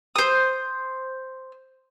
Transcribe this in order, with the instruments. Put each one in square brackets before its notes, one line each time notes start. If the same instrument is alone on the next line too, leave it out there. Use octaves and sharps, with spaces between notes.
[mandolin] C5 D#6